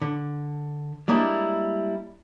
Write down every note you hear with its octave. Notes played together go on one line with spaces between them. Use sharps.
D3
G3 G#3 A#3 D4 E4